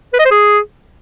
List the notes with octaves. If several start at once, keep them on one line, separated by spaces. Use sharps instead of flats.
B4
D#5
C5
G#4